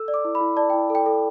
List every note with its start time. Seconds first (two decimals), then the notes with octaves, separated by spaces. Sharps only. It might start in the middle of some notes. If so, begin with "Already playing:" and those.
Already playing: A4 E6
0.08 D5
0.14 D6
0.25 E4
0.35 B5
0.41 E4
0.57 D5 A5
0.70 E4 G5
0.90 A4
0.95 G5
1.06 A4